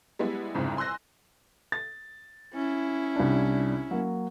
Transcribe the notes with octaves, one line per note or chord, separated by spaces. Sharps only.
G3 G#3 B3 E4
C2 F2 G#2 C#3
G#5 C6 E6 F#6 A#6
A6
C#4 E4
C2 D4
F#3 A#3